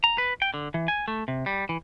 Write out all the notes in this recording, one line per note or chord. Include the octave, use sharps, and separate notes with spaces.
A#5
B4
G5
D3
E3
G#5
A3
C3
G3
E3